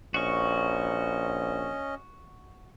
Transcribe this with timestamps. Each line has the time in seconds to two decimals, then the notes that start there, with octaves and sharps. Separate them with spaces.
0.14 A#1 C#4 F#4 D#5 C#6